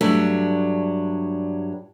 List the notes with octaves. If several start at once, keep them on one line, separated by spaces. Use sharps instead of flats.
G2 F#3 A3 D4